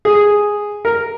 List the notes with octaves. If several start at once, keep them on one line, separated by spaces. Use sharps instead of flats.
G#4
A#4